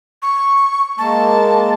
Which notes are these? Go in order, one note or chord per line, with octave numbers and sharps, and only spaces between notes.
C#6
G#3 A#3 A5